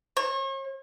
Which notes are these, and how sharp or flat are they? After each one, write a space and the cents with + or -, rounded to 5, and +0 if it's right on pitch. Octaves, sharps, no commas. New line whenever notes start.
C#5 -45